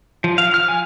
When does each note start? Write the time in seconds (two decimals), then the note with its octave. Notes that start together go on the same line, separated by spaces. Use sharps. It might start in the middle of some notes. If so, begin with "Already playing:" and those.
0.24 F3
0.38 F5
0.54 F6
0.68 G#5